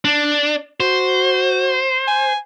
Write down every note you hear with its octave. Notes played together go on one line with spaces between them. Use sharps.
D4
F#4 C5
G#5